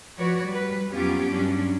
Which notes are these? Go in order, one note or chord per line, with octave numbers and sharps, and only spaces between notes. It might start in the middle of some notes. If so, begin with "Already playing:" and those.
F3 F#4 B4 C#5 D5
G3 B4
F2 F#3 B3 C#4 F4 G4
G2 F#3 C#4 D4